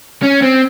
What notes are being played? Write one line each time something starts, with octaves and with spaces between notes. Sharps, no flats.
C#4
C4